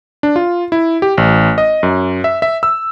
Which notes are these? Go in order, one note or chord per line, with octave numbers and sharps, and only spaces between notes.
D4
F4
E4
G4
A1
D#5
F#2
E5
E5
E6